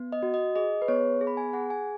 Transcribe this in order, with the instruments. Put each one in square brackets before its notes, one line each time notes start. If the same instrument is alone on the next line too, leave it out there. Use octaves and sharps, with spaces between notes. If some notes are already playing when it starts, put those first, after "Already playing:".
Already playing: [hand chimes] B3
D#5
F#4
D#5
G#4 D#5
B4
B3 C#5
G#4
B5
G#5
G#4 F#5
G#5